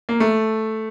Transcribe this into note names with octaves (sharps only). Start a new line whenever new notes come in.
A#3
A3